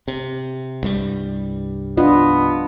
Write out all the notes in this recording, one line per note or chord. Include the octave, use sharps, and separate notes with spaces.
C3
C2 G2 G3
B3 D4 F4 D#5